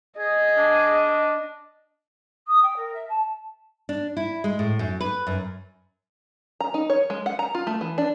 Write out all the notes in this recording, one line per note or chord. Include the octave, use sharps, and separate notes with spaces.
G#4 D#5
D4
D#6
G5
A#4
E5
A5
D4
E4
G#3
A2
F#2
B4
F#2
A#5
D#4
C#5
G#3
F#5
A#5
F4
A3
E3
D4